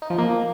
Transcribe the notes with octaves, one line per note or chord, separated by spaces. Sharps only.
D#4
F3
A#3